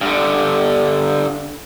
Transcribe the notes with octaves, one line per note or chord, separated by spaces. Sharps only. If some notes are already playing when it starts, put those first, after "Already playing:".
G2 D3